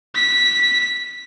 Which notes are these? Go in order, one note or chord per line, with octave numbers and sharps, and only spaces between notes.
B6